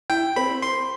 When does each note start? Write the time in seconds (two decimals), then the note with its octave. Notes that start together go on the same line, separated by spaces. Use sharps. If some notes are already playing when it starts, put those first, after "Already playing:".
0.10 E4 G5
0.36 C4 B5
0.62 C6